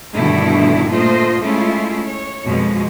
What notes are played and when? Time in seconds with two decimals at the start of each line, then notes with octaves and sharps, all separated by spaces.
0.14 G2 B2 D3 D#3 A3 E4
0.89 A#2 A3 F4 C5 D#5
1.43 G#3 A3 C#4 E4 F4
2.03 C#5
2.44 F2 B2 G#3